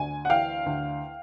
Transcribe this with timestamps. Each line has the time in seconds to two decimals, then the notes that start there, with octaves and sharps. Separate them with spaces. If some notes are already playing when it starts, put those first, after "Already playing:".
Already playing: D2 G#5
0.25 F#5
0.30 E3 F5 G5
0.66 D2